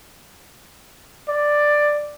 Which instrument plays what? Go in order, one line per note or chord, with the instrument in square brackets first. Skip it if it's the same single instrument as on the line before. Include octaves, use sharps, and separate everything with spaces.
[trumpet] D5